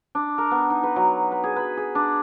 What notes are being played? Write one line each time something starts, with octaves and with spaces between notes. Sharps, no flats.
D4
A#4
B3
D#4
B4
F#3
B4
G#4
B4
G#4
D4